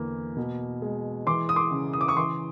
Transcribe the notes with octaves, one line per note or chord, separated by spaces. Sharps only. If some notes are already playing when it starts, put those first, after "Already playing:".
Already playing: E2 D3 A#3
B2
G#3
E3 C6 D6
D#6
C6 D6
C#3
D#6
D6
C#6 D#6
E3 C6 D6